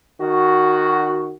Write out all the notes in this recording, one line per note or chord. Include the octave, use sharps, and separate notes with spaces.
D#3 F#4